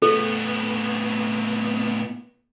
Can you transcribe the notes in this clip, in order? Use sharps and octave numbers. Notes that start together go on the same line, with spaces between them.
A2 B3 A4